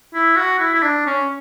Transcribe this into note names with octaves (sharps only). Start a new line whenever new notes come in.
E4
F#4
E4
E4
D4
C#4